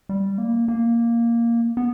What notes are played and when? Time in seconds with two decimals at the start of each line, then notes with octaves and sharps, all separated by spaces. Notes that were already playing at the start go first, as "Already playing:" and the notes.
0.09 G3
0.38 A#3
0.68 A#3
1.77 B3